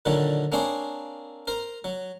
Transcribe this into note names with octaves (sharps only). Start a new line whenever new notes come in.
A#2 D3 D#3 F#3 G3
A#3 C4 D4 G#4 C5 C#5
A#4 C5
F#3